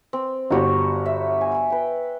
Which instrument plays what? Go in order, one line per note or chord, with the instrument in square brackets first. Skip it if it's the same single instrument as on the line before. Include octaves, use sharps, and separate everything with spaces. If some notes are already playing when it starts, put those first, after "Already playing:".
[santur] C4
[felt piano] G1 F#4 G4 [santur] F#3 C#5
[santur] E5
G#5
B4 G5